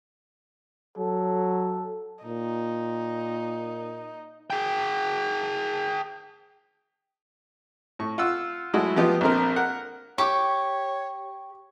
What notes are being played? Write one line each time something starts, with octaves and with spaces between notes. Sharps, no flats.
F#3 A4
A#2 D#4
G#4 G5
A2 C#6
F4 F#5 E6
F#3 G#3 A3 E4 F#4
F3 A3 B3 F4 G4 D#5
A#1 C4 A#4
A#4 F#5
G4 C#5 C#6